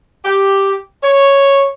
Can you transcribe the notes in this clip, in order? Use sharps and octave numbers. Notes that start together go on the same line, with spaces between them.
G4
C#5